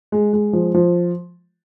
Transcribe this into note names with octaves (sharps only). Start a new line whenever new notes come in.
G#3
G#3
F3
F3